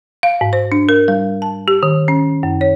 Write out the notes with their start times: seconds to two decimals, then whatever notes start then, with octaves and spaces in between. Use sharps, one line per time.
0.23 F5
0.41 G#2
0.53 C5
0.72 D4
0.89 A#4
1.08 G3
1.42 A5
1.68 G4
1.83 D#3
2.08 C#4
2.43 F#2
2.61 C#5